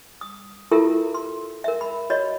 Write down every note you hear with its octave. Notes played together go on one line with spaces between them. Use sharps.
D#6
E4 F4 G4 A4 A#4 E5
C6
A#4 E5
B5
F#4 C#5 D#5 B5